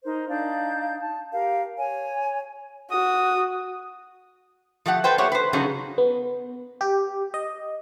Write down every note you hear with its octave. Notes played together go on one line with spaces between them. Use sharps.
D#4 A#4 C5
D4 D#4 F5 G6
A5
G4 A#4 F5
C#5 G#5
F#4 D#6
F3 A3 G4 F#5
A4 B4 C5 G5
A3 A#3 G4 C#5 F#5
B4 C5
C#3 F#3 C#4 D#4 G#4 A4
B3
G4
D#5